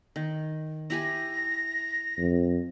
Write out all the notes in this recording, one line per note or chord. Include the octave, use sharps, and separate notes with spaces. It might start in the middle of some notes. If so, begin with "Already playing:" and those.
D#3
E4 G4 G#5 A#6
F2